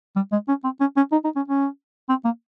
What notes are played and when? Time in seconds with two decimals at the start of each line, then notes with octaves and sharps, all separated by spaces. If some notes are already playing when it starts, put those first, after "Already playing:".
0.16 G3
0.32 G#3
0.48 C#4
0.64 C4
0.80 C#4
0.97 C#4
1.12 D#4
1.24 D#4
1.36 C#4
1.48 C#4
2.09 C4
2.25 A#3